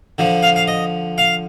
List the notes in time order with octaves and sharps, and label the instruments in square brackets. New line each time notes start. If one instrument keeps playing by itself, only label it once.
[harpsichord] D3 F3
F5
F5
D#5
F5